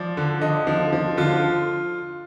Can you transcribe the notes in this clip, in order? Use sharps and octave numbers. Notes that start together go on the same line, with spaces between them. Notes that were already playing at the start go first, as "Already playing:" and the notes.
Already playing: F3 D5
D3
D3 D#5
F3
F3
D3 F4